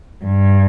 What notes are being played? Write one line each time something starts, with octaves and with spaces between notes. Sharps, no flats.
G2